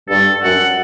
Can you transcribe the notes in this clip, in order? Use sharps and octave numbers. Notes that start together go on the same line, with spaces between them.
G2 A4
F#2 F#5